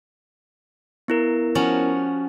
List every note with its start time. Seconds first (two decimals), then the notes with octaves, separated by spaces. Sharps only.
1.08 B3 E4 A#4
1.55 F3 C#4 F#4